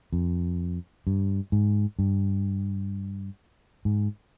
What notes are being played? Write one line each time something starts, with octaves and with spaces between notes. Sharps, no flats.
F2
G2
G#2
G2
G#2